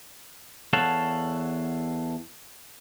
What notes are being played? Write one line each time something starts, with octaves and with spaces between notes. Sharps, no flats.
E2 A4 C#5 F5 F#5 A5